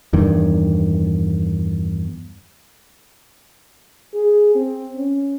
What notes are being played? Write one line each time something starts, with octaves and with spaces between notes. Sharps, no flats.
E2 G2 D#3
G#4
C4
C#4